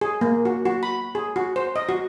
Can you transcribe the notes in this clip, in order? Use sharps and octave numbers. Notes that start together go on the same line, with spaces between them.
G#4
A#3
F#4
F#4
B5
G#4
F#4
C5
D#5
F#4